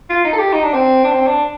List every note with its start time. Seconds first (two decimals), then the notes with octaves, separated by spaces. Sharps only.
0.09 F4
0.24 D#4
0.33 A4
0.38 G4
0.53 D#4
0.63 D4
0.73 C4
1.04 D4
1.12 C4
1.27 D4